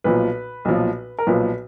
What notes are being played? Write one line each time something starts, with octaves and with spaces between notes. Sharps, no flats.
B1 A#2 F3 B4
B1 A#2 F3
A#4
B1 A#2 F3 B4